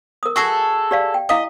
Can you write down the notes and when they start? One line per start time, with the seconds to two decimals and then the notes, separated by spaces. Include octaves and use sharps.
0.23 A#4 D#6
0.36 F#4 G#4 A4 C#6 E6
0.91 G4 D5 F5
1.14 G5
1.29 E4 D#5 F5 D#6